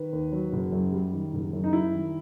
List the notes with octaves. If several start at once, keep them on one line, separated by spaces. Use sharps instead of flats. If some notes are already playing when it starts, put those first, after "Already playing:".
Already playing: D#3 B4
D#2
F#3
F#1
F#2
G3
D#3
F#1
F#2
D#4
G3 E4
D#3